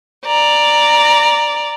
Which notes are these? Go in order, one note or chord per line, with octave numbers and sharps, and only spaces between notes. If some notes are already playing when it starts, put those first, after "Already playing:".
D5 A#5